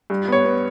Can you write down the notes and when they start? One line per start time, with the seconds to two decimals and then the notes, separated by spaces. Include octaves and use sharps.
0.10 G2
0.28 B3 C#5
0.45 B3